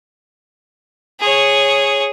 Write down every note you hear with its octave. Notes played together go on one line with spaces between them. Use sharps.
G#4 C#5